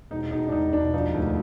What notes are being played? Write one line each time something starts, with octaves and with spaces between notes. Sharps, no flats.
E1 D#4
E1 D#4
D4
E1 D#4
E1 D4
F3 D#4
D2